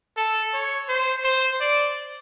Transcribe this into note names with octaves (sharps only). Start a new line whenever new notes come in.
A4
C#5
C5
C5
D5